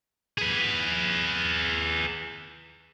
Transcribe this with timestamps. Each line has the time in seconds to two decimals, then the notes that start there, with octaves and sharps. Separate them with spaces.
0.38 G#4 B4